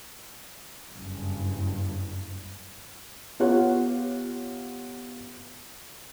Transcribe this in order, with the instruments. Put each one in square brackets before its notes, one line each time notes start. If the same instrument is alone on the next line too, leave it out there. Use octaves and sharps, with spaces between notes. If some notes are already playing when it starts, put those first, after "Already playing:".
[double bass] F#1 G2
[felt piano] B3 F4 G4 C#5 F#5